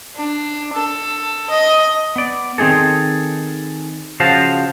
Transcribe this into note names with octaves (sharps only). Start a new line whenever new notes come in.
D4
A4
D#5
B3 D5
D#3 C4 D#4 G#4 A4
C#3 F3 F#4 C5 F5 A5